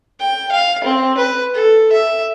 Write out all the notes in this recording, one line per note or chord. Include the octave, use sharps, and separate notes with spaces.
G5
F5
C4
B4
A4
E5